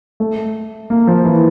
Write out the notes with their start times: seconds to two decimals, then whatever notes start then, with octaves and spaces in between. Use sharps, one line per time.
0.20 A3
0.90 A#3
1.07 F3
1.25 E3